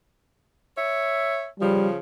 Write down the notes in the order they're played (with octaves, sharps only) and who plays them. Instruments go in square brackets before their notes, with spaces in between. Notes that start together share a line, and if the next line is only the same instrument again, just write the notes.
[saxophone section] C#5 E5
[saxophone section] C#3 F3 [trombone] G3